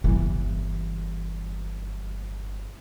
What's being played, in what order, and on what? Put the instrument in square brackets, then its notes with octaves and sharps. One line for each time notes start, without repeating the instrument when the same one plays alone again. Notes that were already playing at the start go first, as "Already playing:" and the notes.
[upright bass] G1 E3